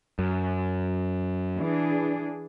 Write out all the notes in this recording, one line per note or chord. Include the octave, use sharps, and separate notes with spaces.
F#2
E3 D4 G#4